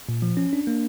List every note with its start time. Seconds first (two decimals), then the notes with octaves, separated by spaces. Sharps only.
0.09 A#2
0.22 F3
0.37 C#4
0.53 D4
0.67 A#3